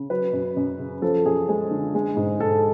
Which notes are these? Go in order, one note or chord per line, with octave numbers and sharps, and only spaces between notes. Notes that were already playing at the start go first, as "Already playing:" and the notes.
Already playing: C#3
F#3 B4
F#2
F#2
C#3
F3 A4
F#2 G#4
G#3 G#4
D3
G#3
G#2
G#2 A4